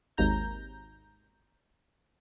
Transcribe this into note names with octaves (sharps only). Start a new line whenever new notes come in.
G#1 D#2 A#5 G6